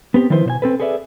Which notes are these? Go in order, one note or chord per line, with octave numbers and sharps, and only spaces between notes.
B3 C4 G4
D#3 F3 E4 B4 C5
B2 C5 G#5
C4 A4 B4
G#4 A4 B4 D5 E5